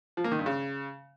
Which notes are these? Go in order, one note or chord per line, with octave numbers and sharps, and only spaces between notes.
F3
A#3
D#3
G2
C#3